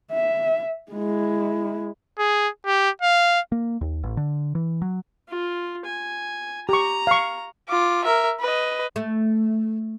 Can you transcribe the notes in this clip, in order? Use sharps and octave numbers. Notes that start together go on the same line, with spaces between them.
E5
G#3 E4
G#4
G4
F5
A#3
D#2
A1
D3
E3
F#3
F4
G#5
G4 A#5 C#6
F5 C#6
F4 D6
A#4 E5
B4 D#5
A3